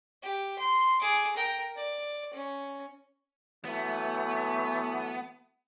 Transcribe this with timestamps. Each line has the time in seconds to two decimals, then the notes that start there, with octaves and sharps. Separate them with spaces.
0.23 G4
0.59 C6
1.01 G#4 D6
1.36 A#4 G5
1.76 D5
2.33 C#4
3.65 E3 F#3 A3 B3